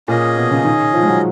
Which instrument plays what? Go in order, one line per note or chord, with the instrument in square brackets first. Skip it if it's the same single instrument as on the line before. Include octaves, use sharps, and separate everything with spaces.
[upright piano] A#2 [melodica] C#4 G#4 D#5
[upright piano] B2
C#3
D#3
F3
G#3
F#3